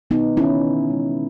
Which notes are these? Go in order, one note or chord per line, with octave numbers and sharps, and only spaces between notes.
B2 B3 D#4
D#3 C#4 E4
D#3
G#3